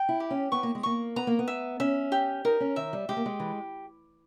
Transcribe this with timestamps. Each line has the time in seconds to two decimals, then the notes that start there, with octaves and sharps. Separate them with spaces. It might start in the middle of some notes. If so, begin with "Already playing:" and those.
Already playing: G5
0.09 E4
0.20 G4
0.30 C#4
0.52 B3 C#6
0.63 A#3
0.75 G#3
0.83 A#3 C#6
1.16 B3 A#5
1.27 A#3
1.39 B3
1.48 E5
1.80 C#4 E5
2.12 G4
2.45 D#4 A#4
2.60 C#4
2.76 D#3 E5
2.93 G3
3.09 G#3 G4
3.17 A#3
3.26 G#3
3.40 E3